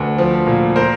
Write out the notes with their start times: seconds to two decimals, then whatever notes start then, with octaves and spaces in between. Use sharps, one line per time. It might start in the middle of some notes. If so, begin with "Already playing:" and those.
Already playing: D2 A4 B4
0.18 F3
0.47 A#2
0.76 A#4 C5